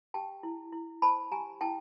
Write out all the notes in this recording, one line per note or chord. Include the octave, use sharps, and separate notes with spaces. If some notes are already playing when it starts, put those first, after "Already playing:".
G4 G5 A5
E4
E4
C5 A5 B5
G4 G#5 A#5
E4 G5 A5